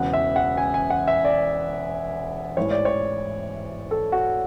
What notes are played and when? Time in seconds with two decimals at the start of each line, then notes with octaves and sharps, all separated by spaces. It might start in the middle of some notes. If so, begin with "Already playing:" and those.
Already playing: E1 E2 C#3 F#5
0.13 E5
0.36 F#5
0.57 G#5
0.74 G#5
0.90 F#5
1.08 E5
1.25 D5
2.57 A1 G#2 E3 C#5
2.71 D5
2.85 C#5
3.91 A4
4.12 F#4